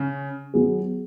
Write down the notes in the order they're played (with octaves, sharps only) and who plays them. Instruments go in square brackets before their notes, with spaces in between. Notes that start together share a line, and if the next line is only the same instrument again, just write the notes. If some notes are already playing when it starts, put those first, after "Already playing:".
Already playing: [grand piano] C#3
[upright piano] F#3 B3 G#4